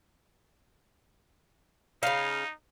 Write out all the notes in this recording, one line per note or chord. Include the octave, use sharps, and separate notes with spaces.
C#3 D#4 F5